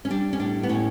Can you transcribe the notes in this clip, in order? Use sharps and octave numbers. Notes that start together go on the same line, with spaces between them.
C#4
G3 D4
C#4
A2 D4
B3
A2 C#4